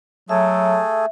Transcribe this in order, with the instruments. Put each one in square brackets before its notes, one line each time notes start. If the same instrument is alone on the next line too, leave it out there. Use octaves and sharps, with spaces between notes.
[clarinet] F#3 [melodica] A3 G#4 A4 [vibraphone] E5